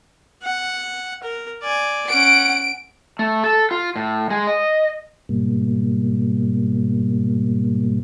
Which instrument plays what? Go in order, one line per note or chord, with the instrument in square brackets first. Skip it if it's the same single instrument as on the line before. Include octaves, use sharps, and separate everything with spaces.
[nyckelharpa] F#5
A#4
D5 G#5
[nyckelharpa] C#4 F#5 [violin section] D7
[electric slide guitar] A3
A4
F4
A2
G#3
D#5
[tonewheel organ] G#2 B2 G3 A#3